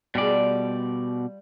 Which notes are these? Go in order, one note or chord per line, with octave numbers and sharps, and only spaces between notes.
B2 G3 F4 G#4 D5